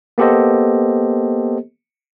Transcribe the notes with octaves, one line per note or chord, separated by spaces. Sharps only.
A#3 B3 G4 A4 C5 D#5